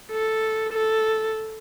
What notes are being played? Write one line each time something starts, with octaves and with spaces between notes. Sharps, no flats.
A4
A4